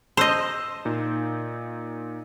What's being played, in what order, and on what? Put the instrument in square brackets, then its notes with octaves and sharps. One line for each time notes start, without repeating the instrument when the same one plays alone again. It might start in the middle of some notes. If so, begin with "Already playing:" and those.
[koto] C5 D#5 [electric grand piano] A5 E6 G6
[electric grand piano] A#2 D#4